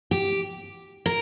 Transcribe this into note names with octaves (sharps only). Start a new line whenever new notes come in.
G4
A#4